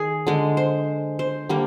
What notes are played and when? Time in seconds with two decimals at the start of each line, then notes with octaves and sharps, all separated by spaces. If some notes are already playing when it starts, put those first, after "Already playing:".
Already playing: D#3 G#4
0.27 D3 G#3
0.57 C5
1.19 C5
1.49 D3 G3 A#3